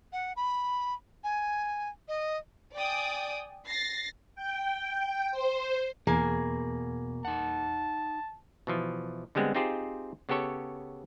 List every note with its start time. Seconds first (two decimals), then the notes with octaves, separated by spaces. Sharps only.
0.13 F#5
0.36 B5
1.24 G#5
2.08 D#5
2.76 D5 G5 G#5 D#6 D7
3.68 A6 A#6 C7
4.35 G5
5.31 C5
6.07 E2 B2 A#3 G#4
7.25 D#4 F#5 A5
8.67 B2 E3 F3
9.35 D3 G3 G#3 B3 C4
9.55 C4 D#4 F4 G4 G#4 C5
10.29 C#3 B3 G4 A4 C#5